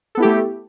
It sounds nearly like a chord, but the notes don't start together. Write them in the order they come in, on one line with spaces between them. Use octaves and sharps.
A4 B3 E4 G4 A3